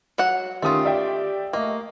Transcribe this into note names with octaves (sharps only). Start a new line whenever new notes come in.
F#3 F#4 F#5
D#3 A3 C#4 F4 G4 D#6
D5 E5 G5
A3 A#3 D#5